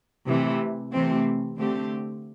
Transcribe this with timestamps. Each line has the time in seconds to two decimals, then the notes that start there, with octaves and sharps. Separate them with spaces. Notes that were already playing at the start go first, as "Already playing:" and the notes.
0.27 C3 E3 A3
0.93 C3 E3 A3 C4
1.58 D3 A3 C4 G4